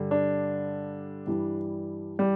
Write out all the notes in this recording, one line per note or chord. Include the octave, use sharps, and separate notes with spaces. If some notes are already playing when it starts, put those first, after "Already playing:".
Already playing: G2 D3 G3
D4
G2 E3 G3
G3